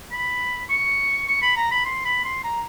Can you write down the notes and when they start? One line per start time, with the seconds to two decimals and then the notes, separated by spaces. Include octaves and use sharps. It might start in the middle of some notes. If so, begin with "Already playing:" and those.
0.12 B5
0.70 C#6
1.28 C#6
1.42 B5
1.56 A#5
1.71 B5
1.85 C6
2.05 B5
2.24 C6
2.44 A#5